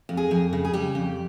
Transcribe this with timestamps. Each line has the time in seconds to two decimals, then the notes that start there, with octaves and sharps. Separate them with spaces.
0.09 F2
0.17 G#4
0.31 F2
0.53 C#3
0.65 G#4
0.73 G3 G4
0.95 F2